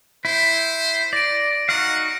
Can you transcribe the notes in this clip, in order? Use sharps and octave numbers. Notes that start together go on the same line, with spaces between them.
E4 C5
D5 A#6 D7
D#4 F#4 F5 F#5